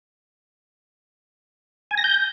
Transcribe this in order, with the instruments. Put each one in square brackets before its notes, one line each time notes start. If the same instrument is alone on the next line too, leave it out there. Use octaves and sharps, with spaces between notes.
[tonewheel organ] G#5
A#6
G6